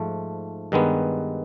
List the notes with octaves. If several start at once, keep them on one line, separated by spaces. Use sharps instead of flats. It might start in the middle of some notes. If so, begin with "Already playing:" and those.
Already playing: G#2 F3 A3
G2 D#3 G#3 B3